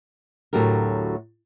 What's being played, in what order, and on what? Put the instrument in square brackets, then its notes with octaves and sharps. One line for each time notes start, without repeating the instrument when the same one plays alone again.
[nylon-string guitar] D2 A2 F#3 G4 A#4